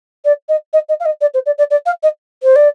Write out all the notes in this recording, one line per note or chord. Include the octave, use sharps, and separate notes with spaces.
D5
D#5
D#5
D#5
F5
D#5
D5
C5
D5
D5
D5
F5
D#5
C5
D5